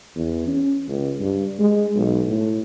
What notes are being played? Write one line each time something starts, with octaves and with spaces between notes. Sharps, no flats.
E2
C#4
C#2
G2
G#3
B1
A2